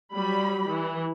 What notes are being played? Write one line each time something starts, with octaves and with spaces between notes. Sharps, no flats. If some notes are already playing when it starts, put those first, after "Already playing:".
F#3 G3 B5
E3